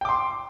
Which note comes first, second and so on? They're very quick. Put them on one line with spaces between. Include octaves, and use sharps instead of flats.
G5 D6 C6